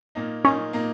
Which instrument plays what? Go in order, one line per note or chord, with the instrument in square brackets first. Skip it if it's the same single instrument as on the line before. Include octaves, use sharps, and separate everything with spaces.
[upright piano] A#2 A#3 D#4
[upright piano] A#2 A#3 D#4 [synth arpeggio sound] C#4
[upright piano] A#2 A#3 D#4